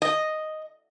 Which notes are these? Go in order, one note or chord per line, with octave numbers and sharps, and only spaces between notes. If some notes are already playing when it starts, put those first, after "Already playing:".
D#5